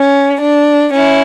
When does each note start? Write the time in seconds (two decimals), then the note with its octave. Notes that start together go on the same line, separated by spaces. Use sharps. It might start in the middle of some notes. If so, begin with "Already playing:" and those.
Already playing: C#4
0.41 D4
0.94 C#4 E4